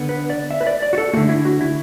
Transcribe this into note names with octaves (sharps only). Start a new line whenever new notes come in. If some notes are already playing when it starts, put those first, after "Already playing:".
Already playing: D3 B3
B4
D5
E5
B4
D5
D5
F#4
A4
D3 A3 F#4
E4
F#4
E4